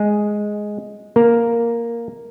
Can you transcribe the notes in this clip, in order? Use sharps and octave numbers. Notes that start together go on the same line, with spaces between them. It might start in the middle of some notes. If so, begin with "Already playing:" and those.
Already playing: G#3 G#4
A#3 A#4